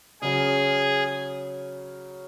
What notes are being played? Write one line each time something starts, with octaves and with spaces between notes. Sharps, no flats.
C#3 F#3 C#4 F#4 G#4